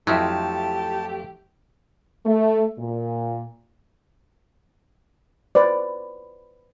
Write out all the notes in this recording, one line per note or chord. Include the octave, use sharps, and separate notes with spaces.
F2 F3 F#3 A3 E4 G4 A5
A3
A#2
B4 C5 D5